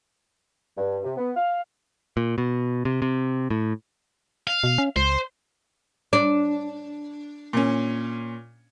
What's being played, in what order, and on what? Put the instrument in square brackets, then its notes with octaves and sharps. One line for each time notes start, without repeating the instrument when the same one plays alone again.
[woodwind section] G2
C3
B3
F5
[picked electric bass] A#2
B2
C3
C3
A2
[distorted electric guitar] F5
[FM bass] B2
C#4
[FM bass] C#2 [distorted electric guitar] C5
[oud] D4
[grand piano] A#2 C#4